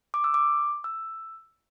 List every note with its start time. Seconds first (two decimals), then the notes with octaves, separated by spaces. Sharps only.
0.14 D6
0.24 E6
0.34 D6
0.84 E6